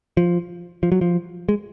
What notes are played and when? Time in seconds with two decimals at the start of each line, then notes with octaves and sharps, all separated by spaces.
0.17 F3
0.83 F3
0.92 F#3
1.01 F3
1.49 G#3